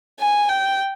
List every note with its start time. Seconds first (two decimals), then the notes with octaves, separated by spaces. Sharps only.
0.20 G#5
0.49 G5